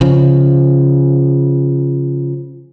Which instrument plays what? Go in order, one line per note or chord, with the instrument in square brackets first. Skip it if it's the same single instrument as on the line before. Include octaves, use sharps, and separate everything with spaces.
[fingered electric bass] C#3 F3